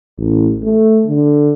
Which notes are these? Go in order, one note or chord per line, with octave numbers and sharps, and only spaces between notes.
A1
A3
D3